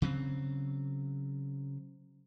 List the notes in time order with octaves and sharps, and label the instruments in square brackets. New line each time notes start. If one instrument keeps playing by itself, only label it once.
[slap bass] C#3 F#3 C4